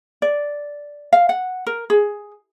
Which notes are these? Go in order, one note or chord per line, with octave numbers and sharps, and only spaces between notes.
D5
F5
F#5
A#4
G#4